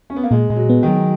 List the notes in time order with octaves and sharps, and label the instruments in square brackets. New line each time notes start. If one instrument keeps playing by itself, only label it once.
[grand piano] C#4
B3
A#3
[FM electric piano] A#2 [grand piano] G#3
[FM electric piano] A#2 [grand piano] G#3
[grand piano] F#3
[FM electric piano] B3
[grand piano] D#3
[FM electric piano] F#3